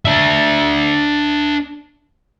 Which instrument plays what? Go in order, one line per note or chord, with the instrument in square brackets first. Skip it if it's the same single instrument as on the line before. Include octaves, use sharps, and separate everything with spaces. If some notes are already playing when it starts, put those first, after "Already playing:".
[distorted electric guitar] D4 E5